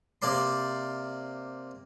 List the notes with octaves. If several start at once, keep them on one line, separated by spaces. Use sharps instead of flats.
C3 A#3 D5 C6